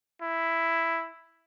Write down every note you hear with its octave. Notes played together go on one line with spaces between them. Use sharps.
E4